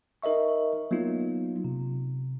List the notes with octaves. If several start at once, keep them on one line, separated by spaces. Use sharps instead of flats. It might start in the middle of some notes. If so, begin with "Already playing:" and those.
D#4 A#4 D#5 E5 C#6
F#3 A#3 B3 D#4 F4
C3